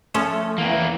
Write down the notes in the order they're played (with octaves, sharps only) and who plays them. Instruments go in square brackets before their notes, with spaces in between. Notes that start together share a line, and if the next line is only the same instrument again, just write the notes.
[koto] F3 C#4 A4 [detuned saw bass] A3
[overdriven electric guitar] E2 A#3 [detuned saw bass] E3